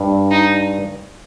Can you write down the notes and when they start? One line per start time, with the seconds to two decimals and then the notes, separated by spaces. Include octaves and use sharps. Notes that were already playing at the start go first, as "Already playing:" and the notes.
Already playing: G2
0.31 D#4